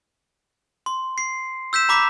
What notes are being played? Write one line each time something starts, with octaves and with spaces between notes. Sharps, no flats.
C6
C7
E6 G6 B6 E7
A#5 B5 D6 B6